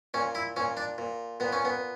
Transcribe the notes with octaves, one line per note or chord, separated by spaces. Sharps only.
A#2 C#4
E4
A#2 C#4
D4
A#2
A#2 B3
C#4
B3